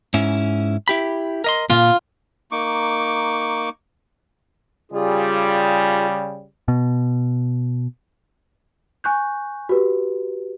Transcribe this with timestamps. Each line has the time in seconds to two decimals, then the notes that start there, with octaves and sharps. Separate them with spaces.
0.14 G#2 C#4 E4
0.88 E4 G4 B5
1.44 A#4 D#5 C6
1.70 A#2 F4
2.51 A#3 D#4 C#6 D6
4.92 C#3 G3 F4 G#4
6.68 B2
9.04 G#5 C#6 F#6 G6
9.69 F#4 G4 B4